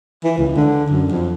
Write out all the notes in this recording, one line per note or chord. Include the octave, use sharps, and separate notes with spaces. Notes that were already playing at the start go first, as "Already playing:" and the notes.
E3
C#2
D3
F#2
F2